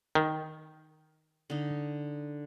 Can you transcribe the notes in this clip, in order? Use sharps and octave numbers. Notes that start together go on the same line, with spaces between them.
D#3
D3 D#4